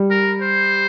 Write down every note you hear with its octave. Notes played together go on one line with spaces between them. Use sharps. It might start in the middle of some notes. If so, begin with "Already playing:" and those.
Already playing: G3
A#4
C5